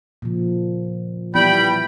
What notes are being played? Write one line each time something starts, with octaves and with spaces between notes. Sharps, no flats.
A#2 C#3 F3
E3 G3 B3 E4 G5 B5